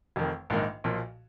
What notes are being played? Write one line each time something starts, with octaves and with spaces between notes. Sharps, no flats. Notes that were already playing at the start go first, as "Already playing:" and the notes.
F1 F2 D#3
A#1 G#2 D#3 A#3 D#4
B1 A#2 F3